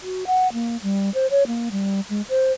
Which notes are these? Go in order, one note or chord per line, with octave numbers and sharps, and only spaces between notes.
F#4
F#5
A#3
G3
C5
C#5
A#3
G3
G#3
C5